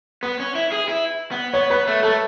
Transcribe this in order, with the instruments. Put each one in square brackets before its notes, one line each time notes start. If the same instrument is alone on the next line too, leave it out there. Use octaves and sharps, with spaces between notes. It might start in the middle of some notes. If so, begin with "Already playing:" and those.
[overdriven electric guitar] B3 [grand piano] B4
[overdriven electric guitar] C#4
E4
G#4
E4
B3
[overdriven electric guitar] B3 [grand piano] C#5
[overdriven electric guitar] B3 [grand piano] B4
[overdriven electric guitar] A3
[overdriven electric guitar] A3 [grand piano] A4